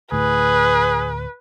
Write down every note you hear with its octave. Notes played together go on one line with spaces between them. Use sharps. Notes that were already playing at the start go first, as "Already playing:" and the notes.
D2 A2 G#4 B4